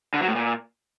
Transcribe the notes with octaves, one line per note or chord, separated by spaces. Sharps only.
D3
F#3
A2
A#2